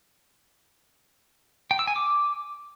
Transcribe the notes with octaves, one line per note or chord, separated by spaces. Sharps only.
G5
E6
G#5
D6